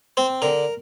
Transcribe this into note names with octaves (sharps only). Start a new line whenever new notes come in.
C4 C5
D3 A#4